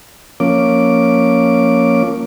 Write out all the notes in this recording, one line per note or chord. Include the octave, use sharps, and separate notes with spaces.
F3 A#3 C#4 D6